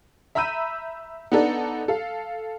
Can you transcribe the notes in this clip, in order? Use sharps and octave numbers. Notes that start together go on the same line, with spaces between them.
E5 A#5 B5 E6 G6 D#7
B3 D4 D#4 A4 D5 F#5
A4 F5